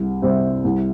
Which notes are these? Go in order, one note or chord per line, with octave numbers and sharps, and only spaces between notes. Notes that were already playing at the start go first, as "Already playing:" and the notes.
Already playing: C2
C3 G3 C4
C2